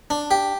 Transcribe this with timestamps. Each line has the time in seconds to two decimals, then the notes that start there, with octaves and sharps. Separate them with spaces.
0.10 D4
0.31 G4